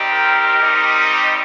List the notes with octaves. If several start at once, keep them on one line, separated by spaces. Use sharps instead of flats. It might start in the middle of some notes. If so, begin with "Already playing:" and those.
Already playing: G3 C4 D#4 G4
A#4
G3 C4 D#4 G4